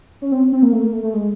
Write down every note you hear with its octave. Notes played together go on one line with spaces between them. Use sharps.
C#4
C4
C4
A#3
A3
A#3
A3
A3
G#3